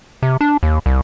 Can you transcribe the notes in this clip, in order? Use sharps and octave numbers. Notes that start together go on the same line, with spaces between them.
C3
D4
D#2
C2